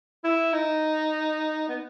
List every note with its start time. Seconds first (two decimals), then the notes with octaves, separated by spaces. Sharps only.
0.24 E4
0.53 D#4
1.69 B3